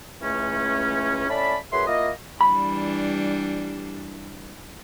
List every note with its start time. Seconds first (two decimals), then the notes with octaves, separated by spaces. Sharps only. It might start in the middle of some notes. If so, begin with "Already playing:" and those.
0.22 C#2 E3 A3 C#4
1.29 A2 C#4 D5 E5 A5 B5
1.72 F#2 E4 G#4 B4 C6
1.87 A#3 E4 F4 D#5
2.41 E3 G3 D4 B5